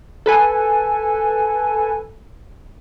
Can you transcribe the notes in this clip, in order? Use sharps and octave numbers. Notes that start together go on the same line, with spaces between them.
A4 B4 G#5